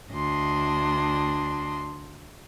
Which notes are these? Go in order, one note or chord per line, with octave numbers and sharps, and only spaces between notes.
D2 D4 D#5 C6